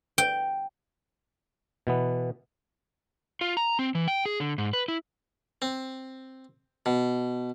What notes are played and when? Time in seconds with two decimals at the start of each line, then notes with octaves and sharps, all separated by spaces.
0.18 G5
1.87 B2 E3 B3
3.41 F4
3.57 A#5
3.79 C4
3.95 E3
4.08 G5
4.26 G#4
4.40 D3
4.58 G#2
4.73 B4
4.88 E4
5.62 C4
6.86 B2